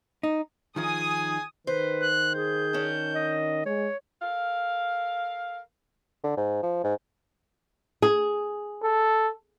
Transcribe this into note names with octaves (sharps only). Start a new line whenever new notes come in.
D#4
D#3 F3 D#4 G#4 G#5 D#6
D#3 B4 C5
F#6
G#4 G6
C#4 D4
D#5
G#3 C#5
A4 A#4 F5
D3
G#2
F3
G#2
G#4
A4